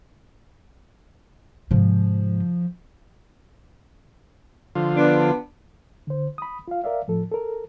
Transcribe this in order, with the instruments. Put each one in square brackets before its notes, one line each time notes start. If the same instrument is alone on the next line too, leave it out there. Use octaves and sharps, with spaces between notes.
[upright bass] G#2 C3 [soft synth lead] F3
[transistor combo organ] D3 F3 F4
[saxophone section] B3 D4
[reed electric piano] D3 C5
B5 D#6
F4 F5
A#4 D5 E5 F5
A2 F3 A4
A4 A#4